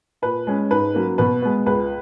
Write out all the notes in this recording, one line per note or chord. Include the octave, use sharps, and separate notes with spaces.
A#2 B4
G#3 C#4
G#2 B4
F#3 A#3 C#4
B2 B4
G#3 B3
C#2 B4